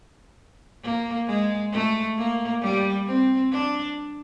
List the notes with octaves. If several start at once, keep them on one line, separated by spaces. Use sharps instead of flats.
A#3
G#3
A3
A#3
G3
C4
D4